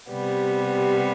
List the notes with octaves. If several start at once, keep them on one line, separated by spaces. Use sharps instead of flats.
C3 G3 B3